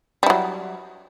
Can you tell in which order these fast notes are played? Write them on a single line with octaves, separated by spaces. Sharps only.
G3 E4 F#3